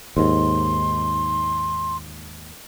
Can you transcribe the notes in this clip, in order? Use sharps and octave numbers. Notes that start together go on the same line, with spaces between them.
D#2 G#2 C6